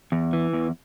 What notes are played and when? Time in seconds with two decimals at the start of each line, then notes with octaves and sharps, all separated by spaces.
0.12 E2
0.33 E3
0.53 E2